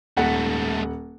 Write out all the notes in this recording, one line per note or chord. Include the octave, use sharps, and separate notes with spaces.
D#1 G#2 A3 F#5